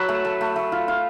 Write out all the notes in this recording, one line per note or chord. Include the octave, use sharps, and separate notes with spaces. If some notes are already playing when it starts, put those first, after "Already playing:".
Already playing: F#3 E5 F#5 A5 B5
A3
A3
A3
A3
F4
F4